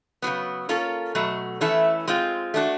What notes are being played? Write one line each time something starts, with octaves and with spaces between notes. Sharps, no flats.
C#3 F#3 B3
A#3 C#4 F4 A4 C#5
B2 F#3 A3
E3 A3 C#4 E4 A4
G#3 C4 F4
A3 D4 F#4